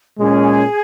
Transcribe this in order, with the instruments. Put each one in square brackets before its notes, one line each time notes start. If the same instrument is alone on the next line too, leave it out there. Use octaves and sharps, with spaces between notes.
[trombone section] A#2 G#3 C#4 [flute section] G#4